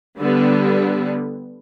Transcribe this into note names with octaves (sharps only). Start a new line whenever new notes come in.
D3 G3 B3